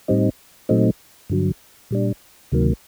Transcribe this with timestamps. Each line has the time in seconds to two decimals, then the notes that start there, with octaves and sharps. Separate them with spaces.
0.08 A2 G3 C4 D#4
0.69 A#2 F#3 A3 C4 D#4
1.29 G2 D3 F#3
1.91 A#2 G3 D4
2.52 D2 C3 D#3 F#3 A#3